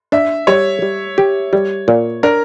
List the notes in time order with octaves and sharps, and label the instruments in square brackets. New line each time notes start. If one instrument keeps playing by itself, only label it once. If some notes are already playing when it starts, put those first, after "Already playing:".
[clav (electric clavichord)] D4 [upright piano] E5
[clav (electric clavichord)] G3 [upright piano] C#5
[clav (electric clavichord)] G3
G4
G3
A#2
[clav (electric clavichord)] D4 [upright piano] A#4